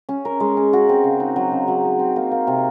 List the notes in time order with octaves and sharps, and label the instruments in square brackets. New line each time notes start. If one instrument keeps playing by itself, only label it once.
[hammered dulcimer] C#4
A#4
G#3
C#4
F#4
C4
C#3
D#4
F#3
C#3
F#3
D#4
C4
A#3
A#3
C3